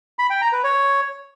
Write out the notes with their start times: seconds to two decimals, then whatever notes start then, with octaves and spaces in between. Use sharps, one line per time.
0.19 B5
0.30 G5
0.41 A#5
0.53 B4
0.64 C#5